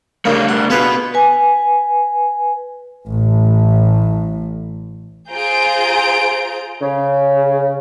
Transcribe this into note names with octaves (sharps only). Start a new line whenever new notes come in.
C#3 A3 A#3 D4 G4
F#5
B3 F4 F#4 G#4 B4
B4 G#5
A1 A2
F4 G#4 C5 A#5 G6 D7
C#3